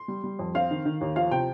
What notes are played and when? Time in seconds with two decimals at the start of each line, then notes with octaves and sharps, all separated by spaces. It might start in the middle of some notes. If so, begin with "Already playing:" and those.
Already playing: C6
0.08 G3
0.24 G3
0.39 F2
0.55 C4 F5
0.71 D#3
0.85 D#3
1.01 D#2
1.16 F3 F5
1.31 C3 G5